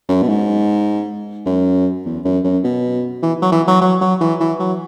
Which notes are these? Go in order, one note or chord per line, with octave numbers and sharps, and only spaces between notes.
F#2
B2
G#2
F#2
E2
F#2
F#2
B2
E3
F#3
E3
F#3
F#3
F#3
E3
E3
F#3